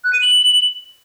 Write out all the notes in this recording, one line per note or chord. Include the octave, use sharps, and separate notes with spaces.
F#6
D#7
F#7